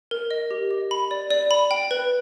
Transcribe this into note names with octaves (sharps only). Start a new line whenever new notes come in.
A#4
D#5
G4
D#5
B5
D5
D5
B5
G5
B4